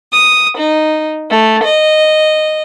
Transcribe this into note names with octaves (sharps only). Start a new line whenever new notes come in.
D#6
D#4
A3
D#5